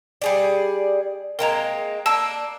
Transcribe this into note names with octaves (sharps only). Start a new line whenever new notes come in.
G3 G#4 D5
G#3 A#3 C4 A#4 A#5
A#3 D4 A5 E6